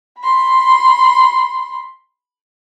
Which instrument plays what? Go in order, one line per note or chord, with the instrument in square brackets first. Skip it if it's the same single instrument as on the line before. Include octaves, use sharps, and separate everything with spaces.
[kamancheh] B5 C6